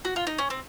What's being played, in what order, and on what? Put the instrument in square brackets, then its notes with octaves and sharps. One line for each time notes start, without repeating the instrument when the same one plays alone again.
[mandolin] F#4
F4
D#4
C#4
C4